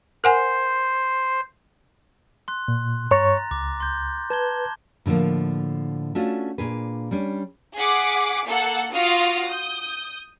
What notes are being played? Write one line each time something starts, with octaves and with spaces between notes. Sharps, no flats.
A#4 C5 F#5 G#5
C6 F#6
A#2
G2 C#5 A#5 C#6 A6 A#6
C#2 D6
C6 G6
B4 A5 G#6 G7
A2 D3 E3 F3 A#3
A3 C#4 D4 F4 F#4
A#2 D4 G#4 B4
G3 C#4 D4
G#4 F#5 D6 B6
A#3 A4 F#5
F4 F#4 F5 D#6 F6 A#6
D#6 G6